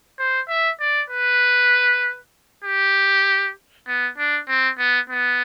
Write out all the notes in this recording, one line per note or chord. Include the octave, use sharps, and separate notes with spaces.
C5
E5
D5
B4
G4
B3
D4
C4
B3
B3